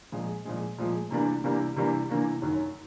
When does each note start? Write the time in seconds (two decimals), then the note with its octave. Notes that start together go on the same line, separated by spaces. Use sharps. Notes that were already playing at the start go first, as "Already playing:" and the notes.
0.12 A#2 F3 G#3
0.45 A#2 F3 G#3
0.78 A#2 F3 G#3
1.11 C3 E3 G3 A#3 D4
1.44 C3 E3 G3 A#3 D4
1.76 C3 E3 G3 A#3 D4
2.09 C3 E3 G3 A#3 D4
2.42 F#2 D#3 F#3